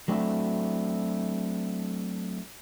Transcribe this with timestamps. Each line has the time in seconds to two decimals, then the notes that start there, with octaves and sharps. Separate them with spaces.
0.08 F#3 A3 C4 D4 E4 F#4